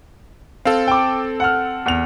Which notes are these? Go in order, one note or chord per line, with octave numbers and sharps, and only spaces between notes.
C4 A4 F5
G5 D6
F#5 F6
E2 F7